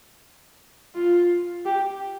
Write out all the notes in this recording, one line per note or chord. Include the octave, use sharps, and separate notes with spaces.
F4
G4